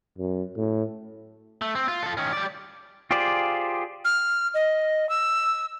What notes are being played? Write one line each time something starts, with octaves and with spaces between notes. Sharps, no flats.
F#2
A2
A3
C4
F4
F4 A4
D#3 C#4
G3 D5
F4 G4 G#4 C5 D5
F6
D#5
E6